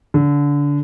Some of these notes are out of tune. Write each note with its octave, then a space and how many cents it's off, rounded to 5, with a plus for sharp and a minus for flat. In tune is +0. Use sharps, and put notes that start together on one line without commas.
D3 -25